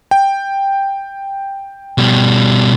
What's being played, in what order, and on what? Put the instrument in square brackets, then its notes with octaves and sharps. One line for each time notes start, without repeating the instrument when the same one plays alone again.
[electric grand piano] G5
[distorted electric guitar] B2 G3